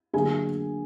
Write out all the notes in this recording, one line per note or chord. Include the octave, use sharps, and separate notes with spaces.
D3 F#3 A#3 G#4 G#5